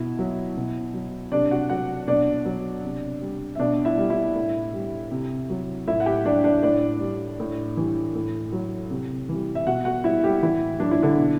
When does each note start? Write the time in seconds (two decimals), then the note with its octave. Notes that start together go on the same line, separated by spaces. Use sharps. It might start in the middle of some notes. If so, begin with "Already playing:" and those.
Already playing: B2 E4 E5
0.19 F#3
0.57 B2
0.94 F#3
1.32 C3 D4 D5
1.51 F#4 F#5
1.69 F#3 F#4 F#5
2.08 B2 D4 D5
2.45 F#3
2.84 C3
3.22 G3
3.55 E5
3.59 B2 D4 D5
3.85 E4 E5
3.98 G3
4.10 E4 E5
4.35 A2
4.74 G3
5.11 C3
5.50 F#3
5.87 A2 E4 E5
6.00 F#5
6.06 G4 G5
6.25 F#3 D4 D5
6.44 D4 D5
6.63 A2 D4 D5
7.00 G3
7.40 A2
7.77 E3 G3
8.15 A2
8.52 F#3
8.90 C3
9.29 E3 G3
9.55 E5
9.66 B2 F#4 F#5
9.85 F#4 F#5
10.04 G3 E4 E5
10.23 G3 G4
10.42 A2 E3 E4
10.80 F#3 D4
10.91 E4
11.02 D3 D4
11.18 B2